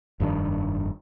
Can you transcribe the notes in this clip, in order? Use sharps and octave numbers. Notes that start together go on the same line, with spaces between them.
F1 G2 D#3 D4